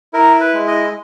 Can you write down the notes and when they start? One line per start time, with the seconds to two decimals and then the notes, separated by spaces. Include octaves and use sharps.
0.13 E4 A#4
0.40 B4
0.54 G#3
0.67 D#5